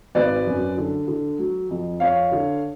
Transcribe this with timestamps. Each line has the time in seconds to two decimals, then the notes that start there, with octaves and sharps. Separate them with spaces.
0.15 G#1 B4 D5
0.46 F#2
0.77 D3
1.07 D3
1.39 F#3
1.70 F2
2.00 F2 C#5 F5
2.32 D3